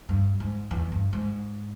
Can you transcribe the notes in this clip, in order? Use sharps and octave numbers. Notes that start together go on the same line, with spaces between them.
G2
G#2
E2
G2
G#2